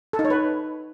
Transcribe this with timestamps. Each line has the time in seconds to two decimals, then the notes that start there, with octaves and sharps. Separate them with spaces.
0.13 A4
0.19 D#4
0.25 C#5
0.30 B4